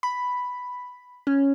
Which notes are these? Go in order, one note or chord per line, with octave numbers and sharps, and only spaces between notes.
B5
C#4